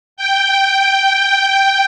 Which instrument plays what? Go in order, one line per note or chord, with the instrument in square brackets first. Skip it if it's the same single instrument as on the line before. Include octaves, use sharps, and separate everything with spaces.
[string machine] G5